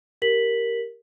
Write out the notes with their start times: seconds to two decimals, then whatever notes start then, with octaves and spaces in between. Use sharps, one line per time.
0.22 G4 A#4 B6 F#7